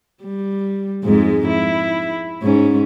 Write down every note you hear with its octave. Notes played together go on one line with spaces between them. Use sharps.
G3
F2 G#2 G#3
E4
G#2 C#4